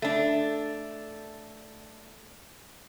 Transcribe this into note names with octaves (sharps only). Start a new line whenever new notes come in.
A3 D4